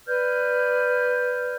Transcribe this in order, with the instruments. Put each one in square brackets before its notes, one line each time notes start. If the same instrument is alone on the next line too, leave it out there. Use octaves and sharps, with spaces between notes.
[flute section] B4 D5 F6 G6